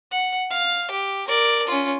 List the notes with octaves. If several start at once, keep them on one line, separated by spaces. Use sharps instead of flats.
F#5
F5
G4
A#4 D5
C#4 F4